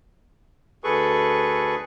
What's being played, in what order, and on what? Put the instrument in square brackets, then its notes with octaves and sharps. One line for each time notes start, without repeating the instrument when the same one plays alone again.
[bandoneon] D2 G#4 A4 B4 C#6